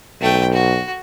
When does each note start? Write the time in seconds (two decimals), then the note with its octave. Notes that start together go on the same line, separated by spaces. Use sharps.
0.21 B1 A3 G5
0.53 F#4